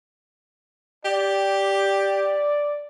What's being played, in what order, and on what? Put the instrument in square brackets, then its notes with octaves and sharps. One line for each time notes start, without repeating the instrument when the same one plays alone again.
[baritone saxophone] G4 [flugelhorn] D5